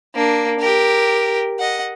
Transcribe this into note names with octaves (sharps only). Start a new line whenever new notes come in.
A#3 D4
G4 A#4
D#5 F#5